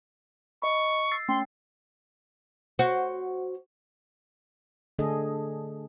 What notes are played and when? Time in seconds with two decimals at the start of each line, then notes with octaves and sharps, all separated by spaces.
0.62 D#5 B5 C#6
1.12 E6 A6 C7
1.28 A3 C#4 G5 C6
2.79 F#4 C5
4.99 D3 A3 D4 G#4 A4 D#5